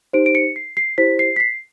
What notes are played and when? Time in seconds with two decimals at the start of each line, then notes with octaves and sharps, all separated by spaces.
0.13 D#4 G4 C5 D7
0.26 D7
0.35 C#7
0.56 C7
0.77 C7
0.98 E4 G4 C5 B6
1.19 C7
1.36 B6
1.40 C7